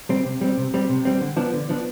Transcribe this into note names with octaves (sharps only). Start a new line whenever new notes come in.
G3 C4
C3
G3 C4
C3
G3 C4
C3
G3 C4
D3
F3 B3 D4
D3
F3 B3 D4